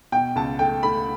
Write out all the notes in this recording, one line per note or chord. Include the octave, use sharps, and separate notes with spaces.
B2 G5
C#2 A5
A3 G5
A3 B5